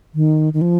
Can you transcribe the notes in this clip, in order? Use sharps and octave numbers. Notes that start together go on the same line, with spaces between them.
D#3
D#3
F3